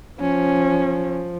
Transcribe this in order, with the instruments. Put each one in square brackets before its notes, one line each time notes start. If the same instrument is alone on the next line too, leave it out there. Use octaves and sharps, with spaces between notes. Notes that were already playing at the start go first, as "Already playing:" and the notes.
[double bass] F3 [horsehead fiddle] C#4